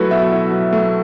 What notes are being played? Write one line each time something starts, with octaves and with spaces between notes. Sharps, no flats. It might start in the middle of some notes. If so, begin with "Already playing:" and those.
Already playing: F#3 A3 E4 F#4 A4 B4
B2 E5
E4
F#3
A3